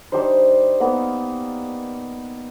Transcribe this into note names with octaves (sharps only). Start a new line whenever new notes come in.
G3 D4 D#4 C5
A#3 B3 D#4